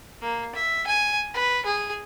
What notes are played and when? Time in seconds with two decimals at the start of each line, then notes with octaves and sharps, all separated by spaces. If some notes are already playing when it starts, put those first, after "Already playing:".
0.22 A#3
0.55 E5
0.87 G#5
1.34 B4
1.66 G#4